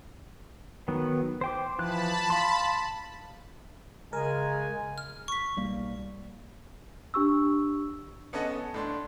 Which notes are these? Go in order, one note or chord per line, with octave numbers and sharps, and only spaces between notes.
D#3 F#3 B3
C5 G5 D6
E3 F3 A5 B5 F#6
F5 C6
C#3 G#3 A#4 G#5
F6
C#6 B6
B1 G3 A#3
D4 G4 C#6 E6
B3 C#4 A4 D#5 F#5
A2 D4 C6